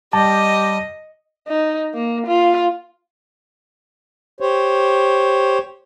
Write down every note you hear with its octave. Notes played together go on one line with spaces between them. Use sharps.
G3 G4 D#5 A5
D#4
A#3
F4
G4 C5 C#5